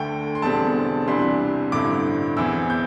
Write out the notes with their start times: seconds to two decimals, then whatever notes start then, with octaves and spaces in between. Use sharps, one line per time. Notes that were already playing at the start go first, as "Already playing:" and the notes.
Already playing: D2 D3 A3 G5
0.35 C6
0.42 E1 E2 D3 G3 C4 A5
1.08 C2 C3 E3 G3 D4 C6
1.72 A1 G2 D3 C4 E4 D6
2.36 E1 E2 E3 C4 E4 E6
2.70 G6